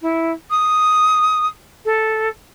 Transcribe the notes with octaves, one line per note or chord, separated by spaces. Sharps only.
E4
D#6
A4